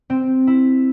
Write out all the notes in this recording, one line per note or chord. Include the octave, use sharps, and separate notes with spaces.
C4
E4